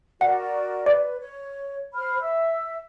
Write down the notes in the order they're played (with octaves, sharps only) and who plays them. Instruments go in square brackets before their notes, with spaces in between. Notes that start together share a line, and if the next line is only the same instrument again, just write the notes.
[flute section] F#4 A#4 D5 [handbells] F#5
[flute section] B4 [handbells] D5
[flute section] C#5
C5 B5 F6
E5 E6